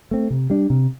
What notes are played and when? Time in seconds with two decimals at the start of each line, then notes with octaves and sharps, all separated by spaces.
0.11 A3 C4
0.30 C3
0.50 G3 D4
0.70 C3